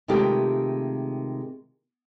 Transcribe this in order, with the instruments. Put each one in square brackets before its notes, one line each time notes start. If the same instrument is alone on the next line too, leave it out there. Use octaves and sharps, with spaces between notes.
[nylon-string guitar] C3 D#3 G#3 A3 F4 G4